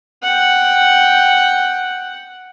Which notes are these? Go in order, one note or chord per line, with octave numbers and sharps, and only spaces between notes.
F#5 G5